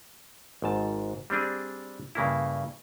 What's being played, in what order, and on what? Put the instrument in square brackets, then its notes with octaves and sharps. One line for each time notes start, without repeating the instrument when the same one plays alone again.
[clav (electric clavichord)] G#1 G#2 A5
G3 C4 D4 G#4
G2 C#3 A#3 E4